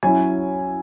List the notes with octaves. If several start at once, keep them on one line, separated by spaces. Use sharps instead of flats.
F#3 C#4 E4 G#5